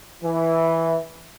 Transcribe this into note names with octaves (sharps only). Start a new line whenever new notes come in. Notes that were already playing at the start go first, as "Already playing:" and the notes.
E3